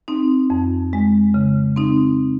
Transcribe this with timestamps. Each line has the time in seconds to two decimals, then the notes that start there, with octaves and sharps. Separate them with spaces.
0.08 C4 D#4
0.50 F2
0.93 G#3
1.34 C#3
1.76 C4 D#4